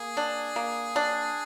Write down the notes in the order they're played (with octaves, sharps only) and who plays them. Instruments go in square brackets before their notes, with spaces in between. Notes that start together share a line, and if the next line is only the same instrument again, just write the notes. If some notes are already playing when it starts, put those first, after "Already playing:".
Already playing: [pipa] A#3 [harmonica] G#4
[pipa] D4
A#3
D4